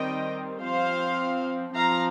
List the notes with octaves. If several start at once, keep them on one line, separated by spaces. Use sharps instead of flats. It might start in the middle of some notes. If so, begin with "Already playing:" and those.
Already playing: D#3 G3 C4 D#5 G5
F3 C4 C5 F5
F3 C4 F5 A#5